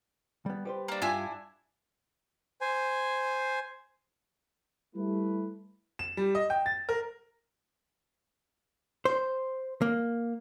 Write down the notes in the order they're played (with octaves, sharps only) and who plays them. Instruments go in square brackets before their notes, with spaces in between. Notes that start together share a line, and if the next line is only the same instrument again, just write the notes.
[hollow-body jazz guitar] G3 B3
G3 B4 C5
[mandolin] A#3 D4
[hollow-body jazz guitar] G2 F4 [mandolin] D4 E4 G#5
[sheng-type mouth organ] C5 G#5
[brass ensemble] G3 A3 E4 B4
[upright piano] E7
G3
D#5
G5
A6
A#4
[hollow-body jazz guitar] C5
A#3